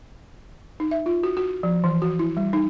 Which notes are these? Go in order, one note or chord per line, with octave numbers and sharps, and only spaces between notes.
D#4
E5
F4
F#4
F#4
F3
E3
F#4
E4
G3
D#4